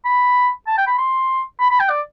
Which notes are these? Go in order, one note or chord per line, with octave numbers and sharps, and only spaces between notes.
B5
A5
G5
B5
C6
B5
B5
G5
D5